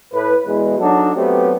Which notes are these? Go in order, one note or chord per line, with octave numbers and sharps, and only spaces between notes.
A2 B4
E2 B2 E3 G#3
F#3 D4 D#4 F#4 A4
F#3 A3 B3 C4 G4